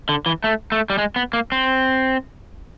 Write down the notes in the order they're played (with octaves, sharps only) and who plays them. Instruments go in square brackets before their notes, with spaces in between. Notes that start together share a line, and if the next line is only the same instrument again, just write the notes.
[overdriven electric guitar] D3
E3
A3
A3
G3
G#3
B3
A#3
C4